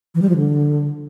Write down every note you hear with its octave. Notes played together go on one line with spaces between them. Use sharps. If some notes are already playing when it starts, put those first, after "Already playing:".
E3
G3
F3
D3